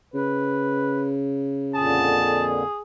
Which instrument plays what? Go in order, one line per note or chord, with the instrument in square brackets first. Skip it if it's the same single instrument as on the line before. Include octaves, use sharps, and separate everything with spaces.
[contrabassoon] C#3 [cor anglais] B4
[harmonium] F2 A#2 D3 [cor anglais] G#4 [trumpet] A5